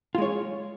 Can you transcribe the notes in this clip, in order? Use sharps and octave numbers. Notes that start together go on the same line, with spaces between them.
G#3 F4 C#5